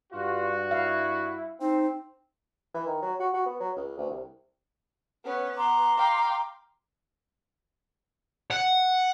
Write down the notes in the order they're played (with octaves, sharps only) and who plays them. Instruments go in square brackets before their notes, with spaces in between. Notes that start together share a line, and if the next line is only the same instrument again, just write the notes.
[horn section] G2 F#4 [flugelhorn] F4
[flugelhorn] E4 [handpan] F5
[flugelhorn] C4 [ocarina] D#4
[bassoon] E3
D#3
F#3
F#4
F#4
B3
F#3
C#2
D2
C2
[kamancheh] B3 B4 [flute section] C#4
[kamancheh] B3 [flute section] A#5 C6 D6
[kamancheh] F5 G5
[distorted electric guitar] F#5